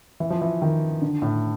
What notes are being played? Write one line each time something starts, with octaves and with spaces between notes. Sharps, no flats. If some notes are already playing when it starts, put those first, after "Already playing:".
E3
F3
E3
D#3
D3
A2